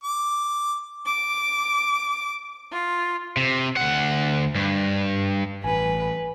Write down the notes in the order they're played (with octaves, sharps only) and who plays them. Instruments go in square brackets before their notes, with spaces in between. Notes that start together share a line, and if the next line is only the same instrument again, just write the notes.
[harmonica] D6
[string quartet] D6
F4
[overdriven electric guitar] C3
D2 F#5
G2
[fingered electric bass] A1 [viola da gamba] B4 [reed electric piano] G#5